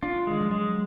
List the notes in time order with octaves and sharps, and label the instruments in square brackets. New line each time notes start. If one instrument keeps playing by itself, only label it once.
[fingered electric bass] D4 [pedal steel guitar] F4
[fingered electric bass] D#3 [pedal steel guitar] G#3
[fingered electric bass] F3
[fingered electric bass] F#3 [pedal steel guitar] G#3